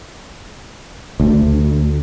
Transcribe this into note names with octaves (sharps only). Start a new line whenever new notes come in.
D2